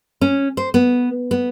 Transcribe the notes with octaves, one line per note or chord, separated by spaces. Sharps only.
C#4
C5
B3
B3